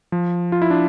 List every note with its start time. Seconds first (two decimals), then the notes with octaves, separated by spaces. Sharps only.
0.12 F3
0.52 F4
0.62 E4
0.70 D4